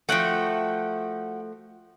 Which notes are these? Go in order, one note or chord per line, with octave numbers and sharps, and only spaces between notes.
F3 A3 F#4 F#5 G5